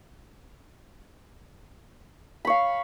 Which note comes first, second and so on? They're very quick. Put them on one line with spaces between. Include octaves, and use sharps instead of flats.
B5 C#5 F5